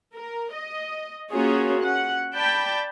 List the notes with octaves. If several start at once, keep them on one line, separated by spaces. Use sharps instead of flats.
A#4
D#5
A#3 C#4 F4 F#4 G#4 C#5
C#4 F#5
D5 G5 A5 B5